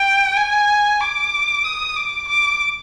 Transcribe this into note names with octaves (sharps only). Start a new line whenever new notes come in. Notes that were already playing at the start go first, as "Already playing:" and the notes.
Already playing: G5
G#5
D6
D#6
D6
D6